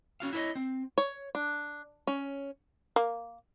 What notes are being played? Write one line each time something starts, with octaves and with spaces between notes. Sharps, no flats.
C#4 F#4 F5
E4 F4 A#4 C#5 D#5
C4
C#5
D4
C#4
A#3